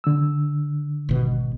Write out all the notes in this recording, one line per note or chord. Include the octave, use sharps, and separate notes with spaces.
D3 E6
G#1 B2